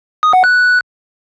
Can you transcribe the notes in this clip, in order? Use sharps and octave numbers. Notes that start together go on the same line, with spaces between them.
D#6
F#5
F#6